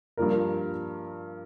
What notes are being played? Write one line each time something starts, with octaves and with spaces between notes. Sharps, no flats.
G2 F3 A#3 F4 A#4